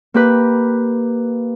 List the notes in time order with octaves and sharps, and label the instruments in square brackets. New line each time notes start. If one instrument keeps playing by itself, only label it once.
[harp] A#3 G4 B4